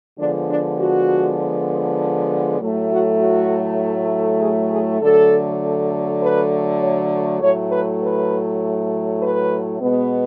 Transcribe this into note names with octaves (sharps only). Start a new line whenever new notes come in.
D3 F3 G#3 B3 D4
D4
F#4
A2 F#3 A3
F#4
F#4
G#4
G#4
D3 F#3 A3 A4
B4
C#5
A2 F#3 A3 C#5
B4
B4
B4
B2 G#3 B3